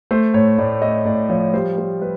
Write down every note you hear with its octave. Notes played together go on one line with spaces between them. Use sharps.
A3 C5
A2 C#5
A2 D5
A3 D#5
A2 D5
F3 C#5
G3 C5
G3 C5
G3 B4